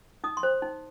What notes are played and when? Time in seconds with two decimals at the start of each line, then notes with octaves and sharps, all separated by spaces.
0.24 D#4 D#6
0.37 C6
0.43 C5
0.62 D#4